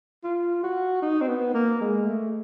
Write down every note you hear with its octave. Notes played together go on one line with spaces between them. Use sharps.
F4
F#4
D#4
C4
B3
A#3
G#3
A3